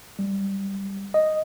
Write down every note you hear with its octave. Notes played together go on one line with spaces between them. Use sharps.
G3
D#5